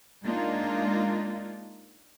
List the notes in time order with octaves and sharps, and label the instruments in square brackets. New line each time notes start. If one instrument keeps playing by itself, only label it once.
[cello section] G#3 A#3 D4 D#4 F4